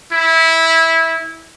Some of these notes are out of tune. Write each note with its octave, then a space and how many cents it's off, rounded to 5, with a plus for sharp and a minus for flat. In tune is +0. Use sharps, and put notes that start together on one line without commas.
E4 -15